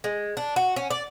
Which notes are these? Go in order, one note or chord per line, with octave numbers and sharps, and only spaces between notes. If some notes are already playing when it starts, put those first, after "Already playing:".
G#3
D4
F#4
C#4
D5